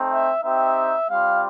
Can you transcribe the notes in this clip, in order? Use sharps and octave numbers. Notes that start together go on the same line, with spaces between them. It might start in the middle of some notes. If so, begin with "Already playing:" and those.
Already playing: A3 C4 D#4
E5
C4 D#4 G4 E5
G3 C4 F4 F5